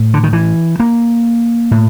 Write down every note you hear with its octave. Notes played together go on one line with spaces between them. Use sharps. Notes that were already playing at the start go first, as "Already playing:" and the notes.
Already playing: A2
D3
D#3
E3
A#3
A2